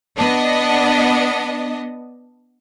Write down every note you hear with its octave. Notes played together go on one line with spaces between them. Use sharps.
B3 D4 D#5